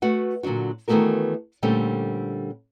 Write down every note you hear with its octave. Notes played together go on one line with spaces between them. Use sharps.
A3 F#4 B4 F#5
A#2 D3 F#3 D4 F#4
D#3 E3 A3 B3 F#4 A#4
A#2 D3 G3 A3 C4 C#4